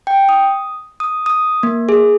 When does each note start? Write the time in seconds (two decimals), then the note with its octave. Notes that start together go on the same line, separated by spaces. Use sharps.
0.07 G5
0.29 D#6
1.00 D#6
1.26 D#6
1.63 A#3
1.89 G#4